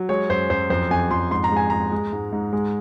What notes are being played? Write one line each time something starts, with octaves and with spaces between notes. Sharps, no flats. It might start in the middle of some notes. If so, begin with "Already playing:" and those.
Already playing: F#3
G#3 C#5
F#2 C5
F#2 C5
F2 C5
F2 G#5
F2 C6
G#2 C6
A#5
G#3 G#5
G#3 A#5
G#3
G#2
G#2
G#3